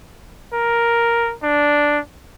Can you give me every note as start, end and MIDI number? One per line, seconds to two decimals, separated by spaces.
0.53 1.33 70
1.43 1.99 62